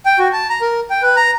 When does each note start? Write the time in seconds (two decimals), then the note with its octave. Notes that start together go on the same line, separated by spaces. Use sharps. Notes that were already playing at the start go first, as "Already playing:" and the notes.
0.06 G5
0.19 F#4
0.33 A5
0.50 A#5
0.61 A#4
0.90 G5
1.02 B4
1.16 A#5